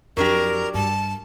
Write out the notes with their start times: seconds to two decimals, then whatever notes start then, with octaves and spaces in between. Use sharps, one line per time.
0.17 F2 F#3 D4 G4 A#4
0.74 G2 A5